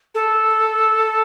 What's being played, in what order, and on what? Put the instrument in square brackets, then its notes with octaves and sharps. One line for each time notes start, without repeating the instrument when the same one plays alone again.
[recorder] A4